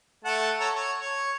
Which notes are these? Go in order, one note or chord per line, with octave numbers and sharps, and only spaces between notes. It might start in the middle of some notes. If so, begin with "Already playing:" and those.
A3 F#5 A5
A4 C#5 A#5
C#5
C#5